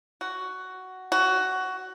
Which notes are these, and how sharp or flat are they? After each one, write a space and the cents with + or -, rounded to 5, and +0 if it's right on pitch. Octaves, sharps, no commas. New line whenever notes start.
F#4 +10
F#4 +15